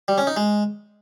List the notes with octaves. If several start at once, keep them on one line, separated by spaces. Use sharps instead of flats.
G3
C#4
D#4
G#3